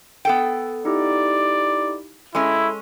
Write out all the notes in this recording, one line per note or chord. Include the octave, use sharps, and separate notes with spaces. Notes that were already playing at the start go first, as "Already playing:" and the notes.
B3 A4 G5
D#4 E4 G4 D5
G#3 C#4 E4 A4 C6